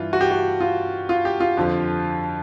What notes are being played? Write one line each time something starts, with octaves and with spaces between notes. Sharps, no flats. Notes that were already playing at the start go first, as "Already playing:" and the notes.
Already playing: G2 E3 F4
F#4
G4
F#4
F4
F4
G4
F4
F2 D3 F3